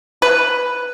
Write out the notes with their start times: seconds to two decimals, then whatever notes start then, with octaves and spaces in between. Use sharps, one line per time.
0.22 B4